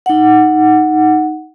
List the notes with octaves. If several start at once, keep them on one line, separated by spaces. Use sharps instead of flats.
D#4 F#5